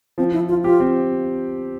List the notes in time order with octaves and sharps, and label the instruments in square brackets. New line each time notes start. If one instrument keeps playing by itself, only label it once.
[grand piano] F3 [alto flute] C4
[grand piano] F3 [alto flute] E4
[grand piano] F3 [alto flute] F4
[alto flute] F4 [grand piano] G4
[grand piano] C4